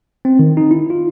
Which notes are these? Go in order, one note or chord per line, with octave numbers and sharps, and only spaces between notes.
C4
D#3
D#4
E4
F4